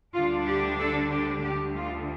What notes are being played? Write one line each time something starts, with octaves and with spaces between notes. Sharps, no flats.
D2 D3 G3 D4 F4
G4
A4
G4
D2 D3 G3 G4
F4